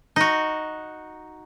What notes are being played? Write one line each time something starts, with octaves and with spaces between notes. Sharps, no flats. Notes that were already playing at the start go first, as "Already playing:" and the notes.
D#4 F#4